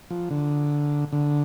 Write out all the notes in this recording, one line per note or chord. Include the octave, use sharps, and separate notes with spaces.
F3
D3
D3